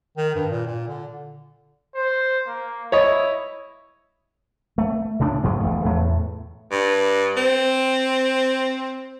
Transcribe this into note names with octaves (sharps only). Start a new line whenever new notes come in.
D#3
G2
A#2
A#2
D3
C5
A#3
E4 C#5 D#5
A3
C#2 A2 C#3 D4
C2 G2 F3 A3
E1 D2 A3
E2 A2 A3
G2
C4